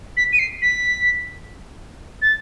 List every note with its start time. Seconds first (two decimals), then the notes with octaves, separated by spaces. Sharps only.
0.16 B6
0.32 D#7
0.38 C7
0.61 B6
2.21 A6